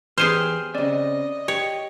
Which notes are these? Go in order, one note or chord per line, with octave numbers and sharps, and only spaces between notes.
E2 B3 G4 G#4 C5 F6
C#3 C4 D5 D#5
G4 C#5